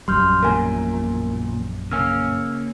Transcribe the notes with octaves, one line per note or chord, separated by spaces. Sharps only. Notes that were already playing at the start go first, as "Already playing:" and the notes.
A#1 F#2 G3 C6 F6 G6
E2 A#2 A#4 G#5
C#3 A#3 C#4 G#5 E6 F6